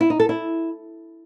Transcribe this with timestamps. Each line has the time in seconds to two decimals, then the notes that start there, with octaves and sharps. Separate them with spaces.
0.01 E4
0.10 D#4
0.20 A4
0.29 E4